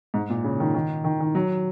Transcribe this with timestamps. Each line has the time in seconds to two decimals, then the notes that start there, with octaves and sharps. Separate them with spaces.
0.14 G#2
0.29 A#2
0.44 C#3
0.60 D#3
0.74 D#3
1.04 D#3
1.20 D#3
1.35 F#3